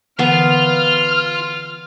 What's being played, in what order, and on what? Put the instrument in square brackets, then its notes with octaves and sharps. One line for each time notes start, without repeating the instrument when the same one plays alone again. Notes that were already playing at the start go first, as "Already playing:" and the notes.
[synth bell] D3 E3 D#7 [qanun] B3 [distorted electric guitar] F4 [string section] F6